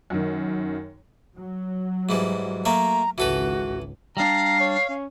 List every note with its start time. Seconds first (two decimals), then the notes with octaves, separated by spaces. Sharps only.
0.10 F#2 D#3
1.37 F#3
2.09 G#2 E3 G3
2.65 A3 A#3 E5 A#5
3.18 G#1 C#2 E3 F#4 A4 B4
4.17 G3 D4 F5 A#5
4.60 C#5
4.89 C#4